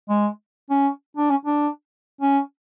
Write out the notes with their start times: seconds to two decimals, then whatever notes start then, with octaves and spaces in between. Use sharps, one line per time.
0.09 G#3
0.70 C#4
1.17 D4
1.30 C#4
1.45 D4
2.21 C#4